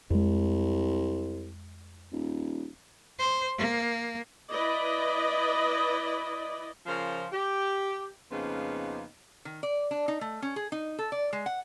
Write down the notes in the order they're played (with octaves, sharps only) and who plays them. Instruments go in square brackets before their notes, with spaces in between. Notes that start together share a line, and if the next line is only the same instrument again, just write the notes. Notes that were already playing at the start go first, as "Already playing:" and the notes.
[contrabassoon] C2 [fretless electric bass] F2 G#3
[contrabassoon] D#1
[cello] C5
A#3
[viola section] E4 B4 D5 D#5
[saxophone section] C#3 F3 F4 A#4 C5
G4
F2 C#3 A#3 B3 D#4 C5
[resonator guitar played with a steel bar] D#3
D5
D4
D#4
A3
C#4
G#4
D#4
A4
D5
G#3
F#5